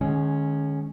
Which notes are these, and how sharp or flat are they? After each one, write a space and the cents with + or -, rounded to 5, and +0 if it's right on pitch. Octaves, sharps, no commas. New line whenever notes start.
D#3 -45 G#3 +15 C#4 +0